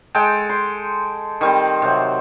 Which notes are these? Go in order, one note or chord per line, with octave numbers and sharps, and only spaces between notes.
G#3 A4 G5
C6
D#3 G3 C4
C3 F#3